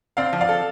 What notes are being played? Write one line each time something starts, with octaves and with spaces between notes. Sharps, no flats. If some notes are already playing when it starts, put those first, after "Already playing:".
C4 D5 F5
F3
D5 F5
A4